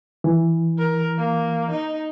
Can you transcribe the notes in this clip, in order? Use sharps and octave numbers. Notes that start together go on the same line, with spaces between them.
E3
A#4
A#3
D#4